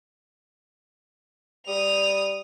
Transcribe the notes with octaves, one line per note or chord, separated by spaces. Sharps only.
G3 D#6 F7